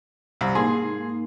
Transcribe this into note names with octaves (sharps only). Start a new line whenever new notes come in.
C2
G#2 A#3 G#4 C6